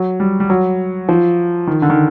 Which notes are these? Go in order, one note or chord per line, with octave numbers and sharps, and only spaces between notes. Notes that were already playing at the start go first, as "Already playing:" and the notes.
Already playing: F#3
G3
G3
F#3
F3
D#3
D3
D#3